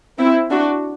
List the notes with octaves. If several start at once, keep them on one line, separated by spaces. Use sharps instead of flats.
C4 E4
D4 F#4